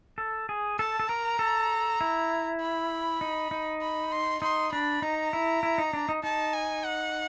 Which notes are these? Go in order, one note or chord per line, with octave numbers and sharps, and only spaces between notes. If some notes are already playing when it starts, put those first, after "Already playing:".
A4
G#4
A4 A5
A4
A#4 A#5
A4
E4
B5
D#4
D#4
B5
C6
D#4 C6
D4 B5
D#4 A#5
E4
E4
D#4
D4
D#4
D#4 A5
G#5
F#5